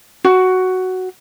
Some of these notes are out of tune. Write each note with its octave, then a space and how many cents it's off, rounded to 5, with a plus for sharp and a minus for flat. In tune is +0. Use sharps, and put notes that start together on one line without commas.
F#4 +5